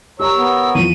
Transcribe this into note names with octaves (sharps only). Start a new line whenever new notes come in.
G4 A#4 C#5 A#5 E6
B3
E2 F3 D#7